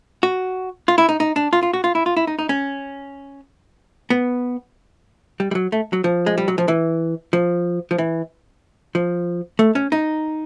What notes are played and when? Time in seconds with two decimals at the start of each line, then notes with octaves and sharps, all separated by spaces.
0.23 F#4
0.88 F4
0.98 E4
1.09 D#4
1.20 D#4
1.36 D4
1.53 F4
1.63 F4
1.73 F#4
1.84 F4
1.95 E4
2.06 F4
2.17 E4
2.27 D#4
2.39 D#4
2.49 C#4
4.10 B3
5.40 G3
5.51 G3
5.55 F#3
5.72 A3
5.93 F#3
6.04 F3
6.26 G#3
6.38 G3
6.48 F#3
6.58 F3
6.68 E3
7.33 F3
7.91 F3
7.98 E3
8.95 F3
9.59 A3
9.75 C#4
9.92 D#4